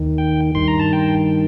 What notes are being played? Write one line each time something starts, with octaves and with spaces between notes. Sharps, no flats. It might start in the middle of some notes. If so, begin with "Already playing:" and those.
Already playing: D#2 D#3
G5
G2 D#3 C6
A#5
A5
G5